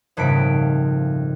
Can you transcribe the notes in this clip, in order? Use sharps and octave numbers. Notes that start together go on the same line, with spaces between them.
D#1 F2 G#2 C#3 B6 D7